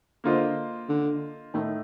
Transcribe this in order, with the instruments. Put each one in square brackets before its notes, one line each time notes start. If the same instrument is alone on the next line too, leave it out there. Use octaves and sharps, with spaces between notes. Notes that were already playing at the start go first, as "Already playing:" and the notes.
[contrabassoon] D3 [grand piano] A#3 F4 C5 D#5
[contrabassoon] D3
[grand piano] A2 A3 D#4 [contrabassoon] D#3